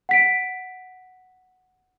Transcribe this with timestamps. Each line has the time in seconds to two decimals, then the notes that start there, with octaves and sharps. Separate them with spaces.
0.09 F#5 B6 D7